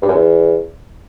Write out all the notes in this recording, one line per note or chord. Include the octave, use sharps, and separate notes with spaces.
G2
F#2
E2